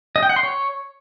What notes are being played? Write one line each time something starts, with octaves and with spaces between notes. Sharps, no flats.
D#5
G5
F#5
C6
C#5